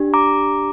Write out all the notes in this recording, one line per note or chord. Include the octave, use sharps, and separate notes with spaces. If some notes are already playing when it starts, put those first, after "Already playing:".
Already playing: D4 G4
A#5 D6